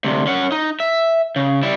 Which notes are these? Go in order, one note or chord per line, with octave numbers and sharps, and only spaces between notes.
D2 C3
C#4 F#5
D#4
E5
C#3
G3 E4